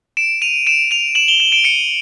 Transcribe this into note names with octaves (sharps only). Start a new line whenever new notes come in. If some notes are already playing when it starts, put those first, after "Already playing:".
D7 E7
D#7 F7
D7 E7
D#7 F7
E7 F#7
F7 G7
E7 F#7
D7 E7
C#7 D#7